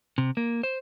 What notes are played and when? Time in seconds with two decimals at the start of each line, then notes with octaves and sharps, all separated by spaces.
0.18 C3
0.37 A#3
0.63 C5